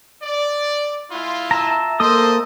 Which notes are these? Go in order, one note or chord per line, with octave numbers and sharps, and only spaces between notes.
D5
G#3 E4 F4
E5 A5 A#5
A#3 A4 C5 D#5 D#6